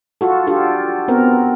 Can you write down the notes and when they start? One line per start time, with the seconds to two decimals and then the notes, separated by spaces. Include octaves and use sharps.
0.21 F4 F#4 A4
0.47 D4 F4 G4 A4
1.08 B3 C4 A#4